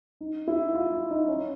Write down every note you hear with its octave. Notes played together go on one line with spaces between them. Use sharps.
D#4
E4
F4
F4
D#4
C#4